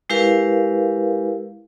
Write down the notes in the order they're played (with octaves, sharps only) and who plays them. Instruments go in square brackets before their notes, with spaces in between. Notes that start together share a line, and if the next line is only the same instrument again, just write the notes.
[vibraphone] G#3 E4 G4 A#4 B4 F5